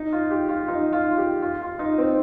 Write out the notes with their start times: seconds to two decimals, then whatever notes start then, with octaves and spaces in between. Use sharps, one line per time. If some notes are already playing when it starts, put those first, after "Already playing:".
Already playing: D#4
0.12 F4
0.31 G4
0.49 F4
0.68 D#4
0.93 F4
1.18 G4
1.42 F4
1.61 F4
1.79 D#4
1.98 C4